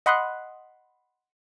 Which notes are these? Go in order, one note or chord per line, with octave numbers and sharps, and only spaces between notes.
D#5 F#5 B5 C6 D#6 F#6